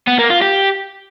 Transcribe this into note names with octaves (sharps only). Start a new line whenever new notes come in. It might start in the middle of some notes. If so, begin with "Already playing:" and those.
B3
A#3
F4
G4